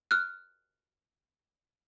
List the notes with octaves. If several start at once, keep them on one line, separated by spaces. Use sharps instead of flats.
F6 F#6